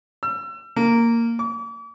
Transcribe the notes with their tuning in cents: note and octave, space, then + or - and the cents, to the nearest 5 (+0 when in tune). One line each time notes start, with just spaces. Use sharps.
E6 +40
A#3 -10
D6 -40